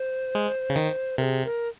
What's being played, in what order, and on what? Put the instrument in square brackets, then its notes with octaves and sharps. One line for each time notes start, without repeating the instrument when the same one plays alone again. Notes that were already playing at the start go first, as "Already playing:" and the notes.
Already playing: [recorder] C5
[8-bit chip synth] G#3
C#3
D#3
[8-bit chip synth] C3 [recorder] G#4 A#4
[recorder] A#4